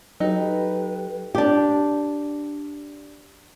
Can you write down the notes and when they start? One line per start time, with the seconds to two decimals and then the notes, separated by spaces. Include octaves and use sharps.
0.20 F#3 D#4 G4 A4 B4 G5
1.35 D4 G4